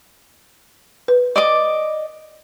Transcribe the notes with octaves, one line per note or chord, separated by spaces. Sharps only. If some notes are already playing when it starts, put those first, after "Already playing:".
B4
D5 D#5 D6